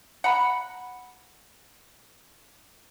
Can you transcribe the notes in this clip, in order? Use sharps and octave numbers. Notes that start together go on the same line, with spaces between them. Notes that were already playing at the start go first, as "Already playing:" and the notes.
F#5 A#5 B5